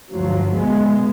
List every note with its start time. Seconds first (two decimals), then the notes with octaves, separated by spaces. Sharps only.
0.12 D2 G2 F3 F#3
0.56 B2 G#3 B3